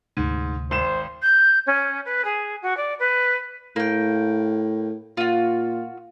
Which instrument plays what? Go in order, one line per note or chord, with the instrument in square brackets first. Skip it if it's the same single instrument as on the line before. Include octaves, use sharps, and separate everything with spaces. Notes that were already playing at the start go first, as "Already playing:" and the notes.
[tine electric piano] D2 C3 [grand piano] G#2
[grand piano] G#1 E7 [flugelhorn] C5
[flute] G6
C#4
B4
G#4
F#4
D5
B4
[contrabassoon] A2 [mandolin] A#3 G5
[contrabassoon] A#2 [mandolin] F4 F#4